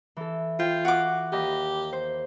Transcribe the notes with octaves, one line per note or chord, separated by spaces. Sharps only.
E3 A4
F4 G5
F#4 D6
D#2 G4 D#5 B5
C5